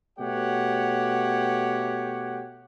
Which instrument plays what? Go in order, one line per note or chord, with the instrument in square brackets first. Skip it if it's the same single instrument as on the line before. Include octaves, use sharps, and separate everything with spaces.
[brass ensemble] B2 A3 G4 C#5 F#5